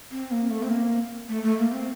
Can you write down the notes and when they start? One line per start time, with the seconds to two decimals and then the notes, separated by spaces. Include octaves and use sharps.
0.11 C4
0.31 A#3
0.50 A3
0.63 C4
0.70 A#3
1.29 A3
1.43 A3
1.58 A#3
1.72 C4